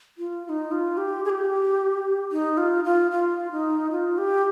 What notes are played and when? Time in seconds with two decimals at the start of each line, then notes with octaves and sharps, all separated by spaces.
0.18 F4
0.45 F4
0.49 D#4
0.71 F4
0.97 G4
1.25 G#4
1.30 G4
2.32 D#4
2.57 F4
2.85 F4
3.11 F4
3.52 D#4
3.91 F4
4.18 G4